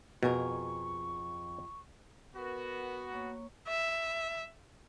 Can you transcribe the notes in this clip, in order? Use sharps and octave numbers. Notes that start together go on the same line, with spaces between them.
F2 B2 G#4 A#4 C#6
B3 F#4 A#4 B4 F#5
A#3 C#5 C#6
E5